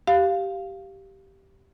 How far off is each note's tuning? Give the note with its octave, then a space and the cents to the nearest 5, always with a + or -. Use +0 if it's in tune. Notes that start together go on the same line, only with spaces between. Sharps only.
G4 -10 F5 +0